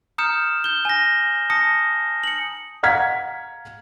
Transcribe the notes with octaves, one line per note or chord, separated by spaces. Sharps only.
A#5 D#6 F6 G6 C#7 E7
G6 G7
G#5 A#6
A5 D#6 A#6 C#7
C#7 F#7
F5 F#5 A#5 F6 G#6 B6